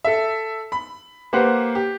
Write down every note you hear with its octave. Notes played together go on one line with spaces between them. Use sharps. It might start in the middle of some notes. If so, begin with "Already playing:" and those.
A4 E5
B5
A#3 G4 B4 C5 F#5
G4